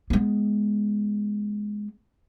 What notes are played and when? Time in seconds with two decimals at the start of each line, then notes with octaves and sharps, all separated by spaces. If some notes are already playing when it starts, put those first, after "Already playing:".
0.10 G#3 B3